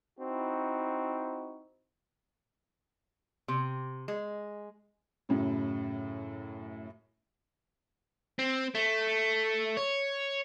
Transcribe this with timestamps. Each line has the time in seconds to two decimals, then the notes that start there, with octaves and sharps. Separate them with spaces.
0.19 C4 D#4 E4 F#4
3.48 C3
4.08 G#3
5.29 F#2 A2 C#3
8.39 C4
8.75 A3
9.77 C#5